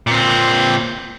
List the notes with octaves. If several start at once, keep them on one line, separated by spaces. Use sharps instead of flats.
A#2 C4